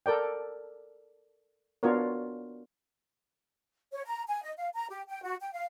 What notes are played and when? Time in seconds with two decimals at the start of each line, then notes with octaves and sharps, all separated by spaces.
0.06 A4 A#4 D5 G5
1.83 B3 D4 F4 F#4 A#4 C#5
3.92 C#5
4.05 A#5
4.27 G#5
4.43 D#5
4.57 F5
4.74 A#5
4.90 G4
5.08 G5
5.23 F#4
5.41 G5
5.53 F5